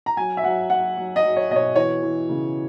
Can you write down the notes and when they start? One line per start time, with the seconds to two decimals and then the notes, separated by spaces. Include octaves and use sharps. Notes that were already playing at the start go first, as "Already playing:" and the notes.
0.06 A#5
0.17 F#3 G#5
0.37 E5
0.43 F#3 F#5
0.70 F#3 F#5
0.97 F#3
1.16 D#5
1.23 F#3
1.36 C#5
1.50 B2 D#5
1.56 C#5
1.76 E3 C#5
2.02 E3
2.29 C#3